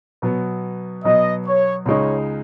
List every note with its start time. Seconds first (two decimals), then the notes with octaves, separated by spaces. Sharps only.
0.22 B2 F#3 B3
1.04 B2 F#3 B3 D#5
1.45 C#5
1.86 C#2 C#3 G#3 D#4 C#5